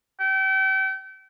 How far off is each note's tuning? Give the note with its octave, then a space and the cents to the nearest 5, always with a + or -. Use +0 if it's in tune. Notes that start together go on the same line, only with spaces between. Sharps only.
G5 -35